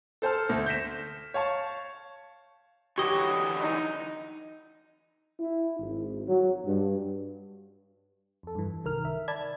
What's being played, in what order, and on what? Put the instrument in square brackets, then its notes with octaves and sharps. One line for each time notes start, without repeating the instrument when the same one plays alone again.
[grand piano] A4 C5 A5 F6
D2
G6 A#6 B6 E7
C#5 F5 A5 C#6
[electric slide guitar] D3 E3 F#3 [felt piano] G4 [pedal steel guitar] C#5 D#5
[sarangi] D#4
[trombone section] E4
G#1
F#3
G2
[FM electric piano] F2 A4
G2 E3
C2 D#3 A#4 F6
E5
D5 A5 B5 G#6